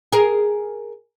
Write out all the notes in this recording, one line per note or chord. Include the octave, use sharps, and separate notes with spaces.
G#4 A#4